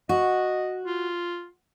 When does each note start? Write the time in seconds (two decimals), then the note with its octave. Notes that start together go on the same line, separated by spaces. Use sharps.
0.09 F#4 D#5
0.86 F4